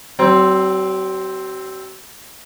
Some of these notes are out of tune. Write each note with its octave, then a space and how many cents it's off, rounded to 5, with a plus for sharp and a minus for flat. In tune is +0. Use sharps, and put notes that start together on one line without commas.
F#3 +45 C4 +0